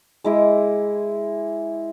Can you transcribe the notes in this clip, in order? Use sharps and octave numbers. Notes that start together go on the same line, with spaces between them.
G#3 E4 D6